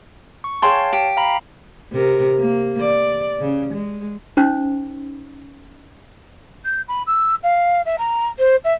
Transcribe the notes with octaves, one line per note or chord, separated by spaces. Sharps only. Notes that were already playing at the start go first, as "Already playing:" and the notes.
C#6
G#4 C#5 F5 G5 A5 C6
G4
F5 A#5 B5
C3 A#4
A#3
D5
C#3
G#3
C#4 D#4 C5
G6
B5
E6
F5
E5
A#5
C5
E5